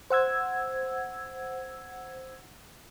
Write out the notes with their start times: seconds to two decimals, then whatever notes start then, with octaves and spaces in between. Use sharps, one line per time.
0.10 C5 F#5 E6 G#6